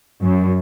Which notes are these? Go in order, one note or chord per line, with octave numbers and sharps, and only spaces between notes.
F#2